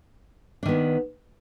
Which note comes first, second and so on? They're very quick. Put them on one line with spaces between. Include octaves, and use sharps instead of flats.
D4 D#3 B3